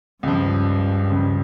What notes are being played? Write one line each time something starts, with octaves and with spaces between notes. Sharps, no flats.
C#2 G2 C#3 F3
C#2 C#3 F3